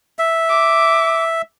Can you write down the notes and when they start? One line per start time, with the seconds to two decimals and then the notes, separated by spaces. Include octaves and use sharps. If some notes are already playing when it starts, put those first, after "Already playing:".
0.19 E5
0.49 D6